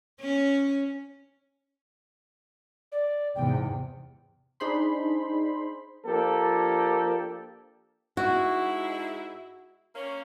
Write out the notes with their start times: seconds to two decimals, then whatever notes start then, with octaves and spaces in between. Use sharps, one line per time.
0.21 C#4
2.92 D5
3.35 E2 G#2 C3 G5
4.60 D4 D#4 G#4 C5 B5 C6
6.06 F3 A#3 D4 G4 A4 A#4
8.17 G#2 G#3 E4 F#4
9.94 A#3 C#4